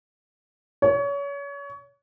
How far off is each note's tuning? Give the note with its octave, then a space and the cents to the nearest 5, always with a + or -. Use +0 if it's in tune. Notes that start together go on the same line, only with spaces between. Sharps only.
C#5 +30